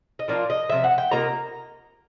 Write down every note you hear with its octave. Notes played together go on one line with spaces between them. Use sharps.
D#5
F3 A#3 D4 F4 D5
D#5
C3 F3 E5
F#5
G5
C3 F3 A#3 D#4 A#5